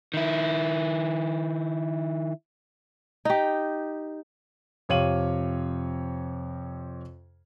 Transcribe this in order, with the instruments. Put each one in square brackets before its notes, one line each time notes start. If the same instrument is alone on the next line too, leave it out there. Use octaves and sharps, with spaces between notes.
[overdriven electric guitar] D#3 E4
[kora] D#4 G4
[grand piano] F2 C3 C#5 F5 D#7 F#7